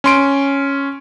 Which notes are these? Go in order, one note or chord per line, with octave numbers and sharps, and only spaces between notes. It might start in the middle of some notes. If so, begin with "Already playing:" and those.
C#4 C6 D7